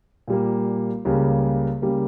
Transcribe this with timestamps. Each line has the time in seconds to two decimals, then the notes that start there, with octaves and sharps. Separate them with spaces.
0.28 A#2 G3 A#3
1.05 C#2 C#3 G3 A#3
1.82 C#3 G3 A#3